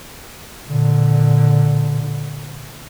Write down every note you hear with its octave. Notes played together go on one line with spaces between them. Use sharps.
A#2 D3